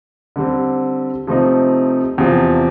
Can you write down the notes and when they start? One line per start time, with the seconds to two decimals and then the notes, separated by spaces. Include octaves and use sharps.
0.36 D3 G3 C4
1.27 C3 F3 A3 C4 D#4
2.18 E2 C3 F3